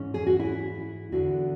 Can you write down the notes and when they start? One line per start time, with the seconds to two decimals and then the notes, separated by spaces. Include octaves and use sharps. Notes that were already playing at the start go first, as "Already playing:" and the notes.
Already playing: G#2 E3 C#4
0.14 G#4
0.27 F#4
0.40 E4
1.12 E2 D3 F#4